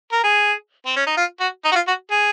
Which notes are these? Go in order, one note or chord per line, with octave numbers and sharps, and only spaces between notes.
A#4
G#4
C4
C#4
D#4
F4
F#4
D#4
F#4
F4
F#4
G#4